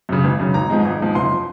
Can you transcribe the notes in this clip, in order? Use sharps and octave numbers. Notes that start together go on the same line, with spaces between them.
F#2 C#3
G#1
F#2 C#3
G#1 A#5
G#2 F3 G#3
G#1
G#2 F3 G#3
F#1 C6
F3